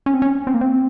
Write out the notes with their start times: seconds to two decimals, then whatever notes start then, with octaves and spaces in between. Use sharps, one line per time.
0.06 C#4
0.14 C4
0.22 C#4
0.47 C4
0.54 A#3
0.61 C4